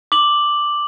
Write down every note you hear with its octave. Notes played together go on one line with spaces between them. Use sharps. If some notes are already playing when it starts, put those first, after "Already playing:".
D6 F#7